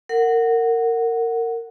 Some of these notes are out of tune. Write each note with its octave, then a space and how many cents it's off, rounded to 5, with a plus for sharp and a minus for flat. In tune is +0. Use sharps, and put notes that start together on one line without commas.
A#4 -25 F#5 +0